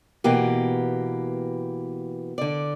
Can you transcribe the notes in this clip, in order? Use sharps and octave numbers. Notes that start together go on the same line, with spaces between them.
B2 E3 A#3 G4
D3 D5